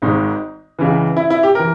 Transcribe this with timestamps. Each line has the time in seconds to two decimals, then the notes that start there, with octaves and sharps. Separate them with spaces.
0.02 G#1 G#2 D#3 D#4
0.79 C#2 C#3 E3
1.17 E4
1.30 E4
1.43 G4
1.55 E3 A#4